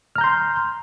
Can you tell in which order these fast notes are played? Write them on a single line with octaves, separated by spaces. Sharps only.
F6 A#5 G6 C6